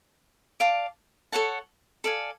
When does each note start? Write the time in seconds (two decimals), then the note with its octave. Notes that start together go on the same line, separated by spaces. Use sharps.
0.60 D5 F5 A5 D6
1.32 A4 C#5 F#5 A5
2.04 A4 D5 F5 G#5